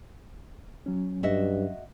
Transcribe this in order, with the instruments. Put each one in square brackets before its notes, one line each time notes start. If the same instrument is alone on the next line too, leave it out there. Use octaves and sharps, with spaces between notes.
[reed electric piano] F#3 C#4
[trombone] G2 [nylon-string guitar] F#4 D#5 E5